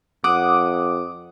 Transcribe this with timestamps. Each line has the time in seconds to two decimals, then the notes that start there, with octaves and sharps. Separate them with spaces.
0.24 F2 F#5 D6 D#6